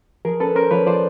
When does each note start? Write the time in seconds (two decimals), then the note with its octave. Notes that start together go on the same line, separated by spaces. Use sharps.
0.25 F3 G#4 A#4
0.40 C#4 A4 B4
0.55 C#4 A#4 C5
0.71 F3 B4 C#5
0.87 F3 C5 D5